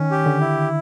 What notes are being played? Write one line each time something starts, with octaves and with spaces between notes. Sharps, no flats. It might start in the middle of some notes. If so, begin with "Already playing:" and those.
Already playing: D#3 C#4
G4
D3
E4